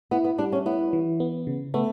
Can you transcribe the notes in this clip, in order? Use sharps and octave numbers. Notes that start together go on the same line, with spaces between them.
B3 E4
B3
G3 D4
C#4
B3 E4
E3
B3
C#3
A3 B3